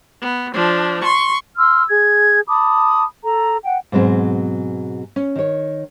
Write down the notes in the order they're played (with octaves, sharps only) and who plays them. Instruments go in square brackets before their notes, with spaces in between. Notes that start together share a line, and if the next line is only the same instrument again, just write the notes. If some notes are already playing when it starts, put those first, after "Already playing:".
[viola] B3
F3 D4
C6 C#6
[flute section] C6 E6 F6
G#4 G#6
A5 B5 D6 D#6
A4 A#5
F#5 G5
[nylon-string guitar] G#2 B2 F#3 C4 G#4
C#4
D#3 C#5